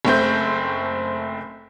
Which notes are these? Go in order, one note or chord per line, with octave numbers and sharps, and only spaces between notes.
F#1 A3 C4 G6